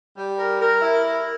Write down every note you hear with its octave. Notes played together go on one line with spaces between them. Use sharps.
G3
A#4
A#4
E4
A#4